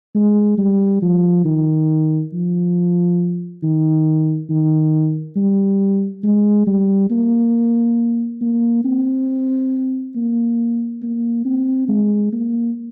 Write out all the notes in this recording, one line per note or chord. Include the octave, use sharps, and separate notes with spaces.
G#3
G3
F3
D#3
F3
D#3
D#3
G3
G#3
G3
A#3
A#3
C4
A#3
A#3
C4
G#3
A#3